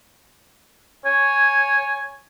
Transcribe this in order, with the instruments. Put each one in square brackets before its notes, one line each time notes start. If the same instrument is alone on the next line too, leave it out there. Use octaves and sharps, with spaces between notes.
[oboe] C#5 [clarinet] G#5